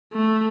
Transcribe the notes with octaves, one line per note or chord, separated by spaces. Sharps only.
A3